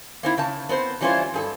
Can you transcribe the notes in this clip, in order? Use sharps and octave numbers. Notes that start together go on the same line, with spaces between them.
A#3 C4 E4
C#3 A5
B3 C4 C5
E3 G3 C#4 E4 F4 C5
G2 G#4 A4